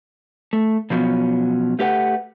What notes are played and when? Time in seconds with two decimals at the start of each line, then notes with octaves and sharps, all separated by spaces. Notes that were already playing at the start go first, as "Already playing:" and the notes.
0.53 A3
0.90 B2 F3 F#3 B3 C#4
1.79 A3 G4 B4 F#5